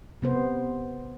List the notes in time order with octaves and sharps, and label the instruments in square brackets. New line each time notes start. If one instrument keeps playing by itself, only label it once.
[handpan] C3 B3 C5